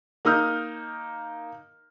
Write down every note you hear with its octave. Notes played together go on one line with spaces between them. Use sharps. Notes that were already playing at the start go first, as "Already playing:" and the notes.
A#3 D#4 D#6 F6 G6